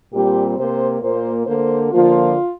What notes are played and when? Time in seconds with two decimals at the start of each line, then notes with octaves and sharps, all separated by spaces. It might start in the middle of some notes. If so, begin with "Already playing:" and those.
0.13 A#2 G3 C4 G4
0.57 C3 A#3 C5
1.01 A#2 A#3 C5
1.46 D3 A#3 C5
1.91 D3 F3 A#3 F4